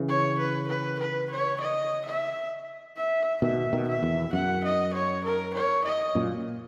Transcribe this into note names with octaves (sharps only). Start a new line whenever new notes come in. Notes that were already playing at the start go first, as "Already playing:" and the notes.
Already playing: C#3 E3
C#5
B4
B4
B4
C#5
D#5
E5
E5
B2 D#3 E5
B2 D#3
E5
E2
F#2 F#5
D#5
C#5
A#4
C#5
D#5
F#2 A#2